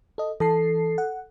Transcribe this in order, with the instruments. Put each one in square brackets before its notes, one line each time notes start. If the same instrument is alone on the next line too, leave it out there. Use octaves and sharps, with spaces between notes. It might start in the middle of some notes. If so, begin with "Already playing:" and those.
[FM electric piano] A4 D#5
[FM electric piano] E3 A5 C7 [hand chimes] A4
[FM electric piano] F#5